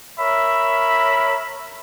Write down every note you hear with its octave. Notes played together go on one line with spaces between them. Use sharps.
A#4 C#5 E5 B5